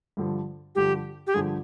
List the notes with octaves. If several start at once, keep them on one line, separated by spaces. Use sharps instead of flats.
G2 D3 F3
G2 D3 F3 G4
G4
G2 D3 F3 G#4